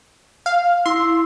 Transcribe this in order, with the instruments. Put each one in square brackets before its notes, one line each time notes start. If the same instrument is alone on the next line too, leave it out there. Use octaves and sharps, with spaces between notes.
[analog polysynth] F5
[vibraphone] E4 [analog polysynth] C6